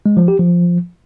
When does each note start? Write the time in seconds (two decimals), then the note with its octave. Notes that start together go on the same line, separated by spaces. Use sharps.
0.06 G#3
0.17 F3
0.28 G4
0.39 F3